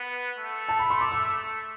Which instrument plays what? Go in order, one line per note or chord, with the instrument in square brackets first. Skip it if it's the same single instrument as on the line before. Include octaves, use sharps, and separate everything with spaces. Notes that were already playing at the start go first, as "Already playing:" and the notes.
Already playing: [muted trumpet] B3
A3
[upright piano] A5
B5
C6
D6
E6